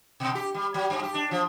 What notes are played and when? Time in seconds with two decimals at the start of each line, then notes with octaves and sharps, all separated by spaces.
0.20 B2
0.35 G4
0.54 G3
0.74 F#3
0.90 F#2
1.03 G4
1.14 D4
1.31 F3